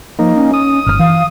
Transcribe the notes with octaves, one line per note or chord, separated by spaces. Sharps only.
F3 A#3 D#4
C#4
D#6
G1 C#3 C#4 F6
E3 F5